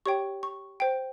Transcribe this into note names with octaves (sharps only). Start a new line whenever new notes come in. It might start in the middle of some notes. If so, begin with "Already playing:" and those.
G4 C#5 G5 C#6
C#6
C5 G5